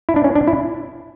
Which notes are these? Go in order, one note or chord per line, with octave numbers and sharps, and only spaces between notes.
E4
D4
C#4
D4
E4